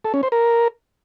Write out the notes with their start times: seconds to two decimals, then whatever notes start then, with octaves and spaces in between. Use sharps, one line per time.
0.05 A4
0.14 C#4
0.23 C5
0.32 A#4